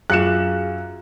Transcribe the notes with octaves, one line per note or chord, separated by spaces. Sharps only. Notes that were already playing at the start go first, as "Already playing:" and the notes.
F#2 F4 F#4 G#4 F5 F#6 C#7 E7